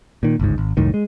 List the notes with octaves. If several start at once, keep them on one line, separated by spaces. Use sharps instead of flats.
A#2 D#3
G1 C#2 G#2
G#1
C2 F#2 A2 D#3
G#3